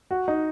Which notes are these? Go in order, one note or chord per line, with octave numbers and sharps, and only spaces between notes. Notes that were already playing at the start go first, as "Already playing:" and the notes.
F#4
D#4